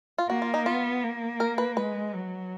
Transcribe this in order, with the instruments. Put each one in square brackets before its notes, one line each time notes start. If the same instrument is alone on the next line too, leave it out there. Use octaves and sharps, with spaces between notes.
[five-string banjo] F4
[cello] A#3 [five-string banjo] F#4
[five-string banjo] F4
D#4
[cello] B3 [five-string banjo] F4
[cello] A#3
[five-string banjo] A#4
B4
[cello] G#3 [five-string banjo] B4
[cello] F#3